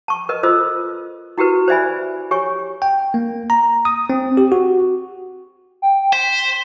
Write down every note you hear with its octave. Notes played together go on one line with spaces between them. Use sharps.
A5 C#6
A#4 B4 D#5
F4 A4 C5 D#5 E6
E4 F#4 G4 A#4 B4
C5 D5 E5 G#5 B5
G4 C#5 G#5 C#6
G5
A#3
A#5
D#6
C4
G4
F#4
G5
C5 B6